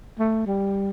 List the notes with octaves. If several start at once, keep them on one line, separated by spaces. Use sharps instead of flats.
A3
G3